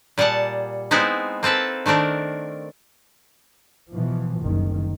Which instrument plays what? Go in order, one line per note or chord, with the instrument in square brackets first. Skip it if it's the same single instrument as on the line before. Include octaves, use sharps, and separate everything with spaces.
[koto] A#2 G3 G#4 F#5 A5
G#3 B3 C4 D#4 E4
A#3 C4 A4 B4 A5
D#3 A3 C4 D4 A#4
[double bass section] B2 E3 F3
F#1 C2 D#3